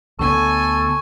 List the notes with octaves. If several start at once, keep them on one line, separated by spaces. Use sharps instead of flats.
D2 D3 B3 A4 G#5 C#6